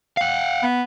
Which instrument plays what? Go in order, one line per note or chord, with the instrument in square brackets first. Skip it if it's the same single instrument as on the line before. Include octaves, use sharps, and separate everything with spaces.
[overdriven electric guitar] F5 F#5
[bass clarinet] B3